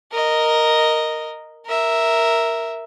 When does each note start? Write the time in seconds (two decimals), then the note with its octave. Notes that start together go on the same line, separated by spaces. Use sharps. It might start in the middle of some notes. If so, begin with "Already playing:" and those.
0.12 A#4 D#5
1.66 A#4 E5